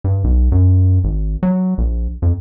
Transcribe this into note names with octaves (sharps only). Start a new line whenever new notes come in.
G2
B1
F#2
G#1
F#3
A#1
F2